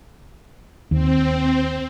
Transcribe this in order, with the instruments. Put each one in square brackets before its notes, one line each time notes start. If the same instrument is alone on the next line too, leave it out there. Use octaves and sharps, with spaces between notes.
[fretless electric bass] D#2 [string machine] C4